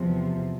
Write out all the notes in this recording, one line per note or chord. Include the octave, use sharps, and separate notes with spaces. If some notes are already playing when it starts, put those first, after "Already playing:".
Already playing: E2 C3 F3